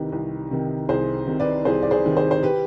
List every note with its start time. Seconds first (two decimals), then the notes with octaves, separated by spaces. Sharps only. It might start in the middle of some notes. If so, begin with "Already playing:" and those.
Already playing: C2 C3 D#3 G4 B4
0.12 C2
0.51 C3 D#3
0.89 C2 G#4 C5
1.27 C3 D#3
1.40 B4 D5
1.65 C2 G#4 C5
1.83 D5
1.91 G#4 C5
2.04 C3 D#3
2.17 G#4 C5
2.31 C5
2.43 G4 B4